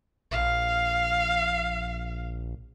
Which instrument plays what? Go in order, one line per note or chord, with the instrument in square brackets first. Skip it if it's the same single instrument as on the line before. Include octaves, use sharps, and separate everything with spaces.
[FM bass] A#1 [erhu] F5